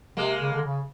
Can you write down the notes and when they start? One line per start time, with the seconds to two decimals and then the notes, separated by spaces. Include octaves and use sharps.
0.17 C3 G#3 A#3
0.40 C#3
0.53 D3
0.64 C#3